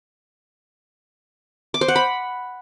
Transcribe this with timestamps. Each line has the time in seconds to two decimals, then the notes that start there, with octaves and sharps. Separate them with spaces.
1.74 D6
1.81 C5
1.88 F#5
1.96 B5